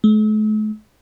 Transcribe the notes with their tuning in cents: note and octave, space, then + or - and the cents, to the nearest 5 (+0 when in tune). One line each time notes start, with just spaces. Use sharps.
A3 -45